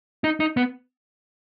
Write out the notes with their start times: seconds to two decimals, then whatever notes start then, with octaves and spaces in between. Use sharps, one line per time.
0.24 D#4
0.40 D#4
0.57 B3